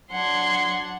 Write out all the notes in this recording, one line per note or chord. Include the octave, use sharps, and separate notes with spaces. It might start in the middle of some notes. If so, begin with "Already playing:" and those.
F#3 D4 F#5 C6 G#6